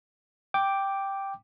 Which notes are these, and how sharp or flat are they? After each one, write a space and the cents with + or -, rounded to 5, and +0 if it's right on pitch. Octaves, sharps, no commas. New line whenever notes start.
G5 +0 D6 +0